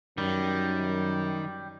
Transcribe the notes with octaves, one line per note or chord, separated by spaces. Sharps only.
F#2 D#3 G3